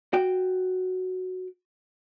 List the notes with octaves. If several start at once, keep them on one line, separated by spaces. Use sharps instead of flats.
F#4 G5